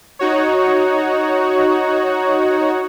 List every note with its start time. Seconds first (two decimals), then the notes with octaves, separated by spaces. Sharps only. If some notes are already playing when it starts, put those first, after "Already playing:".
0.19 D#4 F#4 C#5